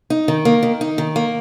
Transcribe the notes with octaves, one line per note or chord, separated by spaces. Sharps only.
D#4
D#3
A#3
D#3
D#4
D#3
A#3